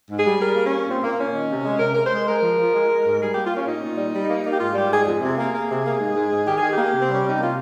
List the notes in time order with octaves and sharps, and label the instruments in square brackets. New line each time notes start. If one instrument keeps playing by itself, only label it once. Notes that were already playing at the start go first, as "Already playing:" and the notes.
[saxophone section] G#2
G#4
G3
G3 A#4
A#3
C#4
A#3
A#2 C4
A#2 A#3
A#2 C#4
D#3
C3
G#3
C3 A#4
G#3 A#4
C5
G#3
G#3 A#4
F3
F3
G#3
G#3
G#2
G3 G#4
A#3 G4
F4
A#3 C#4
A#2 D#4
A#2
G3
G3
A#3
A#3
G4
G#2 F4
G3 G4
G#2 G#4
F2 G#4
C3
A#3
A#3
C3
A#3
G#2
G#2
G#2
D#3 G4
D#3 G#4
G4
A#3
C3
C4
G3 C#4
C3 D#4
A#3 F4